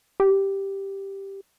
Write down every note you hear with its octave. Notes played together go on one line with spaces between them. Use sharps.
G4